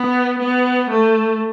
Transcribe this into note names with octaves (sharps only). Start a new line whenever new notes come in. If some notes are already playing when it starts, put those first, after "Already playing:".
Already playing: B3
B3
A3